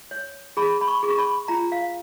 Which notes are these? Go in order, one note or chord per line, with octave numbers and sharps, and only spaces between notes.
C#5
G#4 B5
B5
C#6
G#4
C#6
B5
F4 A#5
F5